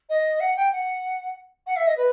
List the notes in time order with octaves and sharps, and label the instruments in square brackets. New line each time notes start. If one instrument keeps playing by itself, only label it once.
[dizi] D#5
F#5
G5
F#5
F#5
E5
D#5
B4